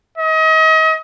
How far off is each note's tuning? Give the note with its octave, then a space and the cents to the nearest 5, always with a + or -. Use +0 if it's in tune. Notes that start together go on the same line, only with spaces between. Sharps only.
D#5 +35